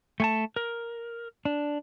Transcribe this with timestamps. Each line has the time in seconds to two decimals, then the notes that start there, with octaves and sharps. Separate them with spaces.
0.20 A3 G#5 A5
0.56 A#4
1.45 D4